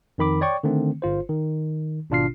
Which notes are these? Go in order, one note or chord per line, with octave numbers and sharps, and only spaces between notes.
F2 D#3 B5 D6
C#5 D5 G5 C#6
D3 D#3 A3 C4
G1 F4 C5
D#3
G#1 B2 D4 F4 F6 C7